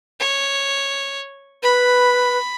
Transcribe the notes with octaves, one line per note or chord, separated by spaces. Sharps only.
C#5
B4 B5